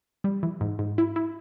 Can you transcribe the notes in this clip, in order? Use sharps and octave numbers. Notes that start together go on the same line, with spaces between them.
G3
E3
G#2
G#2
E4
E4